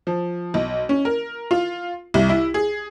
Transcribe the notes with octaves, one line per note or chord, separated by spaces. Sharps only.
F3
B1
C#4
A#4
F4
C2
E4
G#4